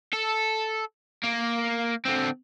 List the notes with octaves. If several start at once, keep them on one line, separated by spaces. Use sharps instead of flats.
A4
A#3
D3 C4